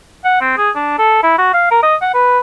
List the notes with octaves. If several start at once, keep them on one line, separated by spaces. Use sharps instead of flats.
F#5
C4
G#4
D4
A4
E4
F#4
F5
A#4
D#5
F#5
B4